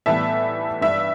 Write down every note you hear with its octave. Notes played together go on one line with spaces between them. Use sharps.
A2 E3 G3 B3 E5 A5
G2 G3 D4 E5